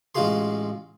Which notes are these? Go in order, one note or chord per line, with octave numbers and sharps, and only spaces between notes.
A1 G#3 F4 F#4 G#4 C6